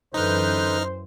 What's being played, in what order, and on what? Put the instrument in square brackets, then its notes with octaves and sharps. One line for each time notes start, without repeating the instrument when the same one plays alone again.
[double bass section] F#2 E3 [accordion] D3 B4 G6 [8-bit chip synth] D#4 F6 [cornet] C5